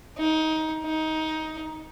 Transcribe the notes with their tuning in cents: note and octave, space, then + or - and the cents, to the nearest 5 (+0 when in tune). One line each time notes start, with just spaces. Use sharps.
D#4 +20
D#4 +15